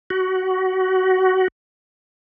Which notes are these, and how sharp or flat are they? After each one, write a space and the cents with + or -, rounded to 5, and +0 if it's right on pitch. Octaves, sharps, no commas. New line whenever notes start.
F#4 +20